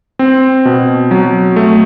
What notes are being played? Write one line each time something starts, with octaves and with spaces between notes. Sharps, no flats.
C4
B2
F#3
A3